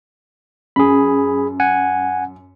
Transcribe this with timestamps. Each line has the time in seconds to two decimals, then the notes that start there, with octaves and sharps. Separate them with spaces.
0.76 F#2 G#4 B5
1.60 F#5 G#5